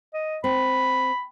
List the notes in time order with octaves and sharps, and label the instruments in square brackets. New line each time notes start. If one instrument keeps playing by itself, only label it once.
[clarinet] D#5
[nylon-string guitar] C4 [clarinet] B5